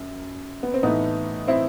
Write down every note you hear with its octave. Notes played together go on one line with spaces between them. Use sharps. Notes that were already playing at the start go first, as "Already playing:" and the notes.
Already playing: F#2
B3
C4
A2 E3 A3 B3 D#4
C4 E4